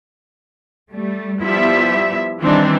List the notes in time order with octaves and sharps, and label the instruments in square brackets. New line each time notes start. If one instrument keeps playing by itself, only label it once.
[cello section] G3 A3
[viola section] F3 G3 [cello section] B3 E4 E5
[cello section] D#3 G3 D#4 [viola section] E3 C4 D4